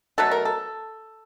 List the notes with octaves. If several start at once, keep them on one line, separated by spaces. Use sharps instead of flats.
B2 F#3 A3 A4
A#4
A4